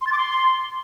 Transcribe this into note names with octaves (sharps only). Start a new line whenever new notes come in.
C6
A6
D6
C6